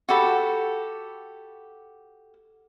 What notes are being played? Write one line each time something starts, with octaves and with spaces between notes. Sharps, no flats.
F#4 G4 A4 B5